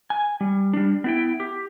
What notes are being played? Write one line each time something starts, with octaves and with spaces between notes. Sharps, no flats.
G#5
G3
G3 D4
B3 E4 G5
G4